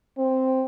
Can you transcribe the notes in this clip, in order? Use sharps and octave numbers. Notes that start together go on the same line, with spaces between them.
C4